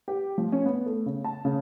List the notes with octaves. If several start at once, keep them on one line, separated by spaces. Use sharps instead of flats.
G4
F3
C#4
B3
A3
C#3
A5
C#3